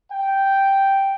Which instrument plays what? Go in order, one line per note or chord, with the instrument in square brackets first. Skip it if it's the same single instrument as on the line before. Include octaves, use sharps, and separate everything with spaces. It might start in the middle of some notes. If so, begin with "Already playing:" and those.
[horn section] G5